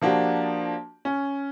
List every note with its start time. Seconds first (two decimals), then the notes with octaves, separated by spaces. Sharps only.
0.01 F3 A#3 D4 F#4 G4
1.05 C#4